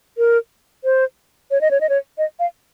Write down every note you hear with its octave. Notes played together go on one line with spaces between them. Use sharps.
A#4
C5
C#5
D#5
C#5
D#5
C#5
D#5
F5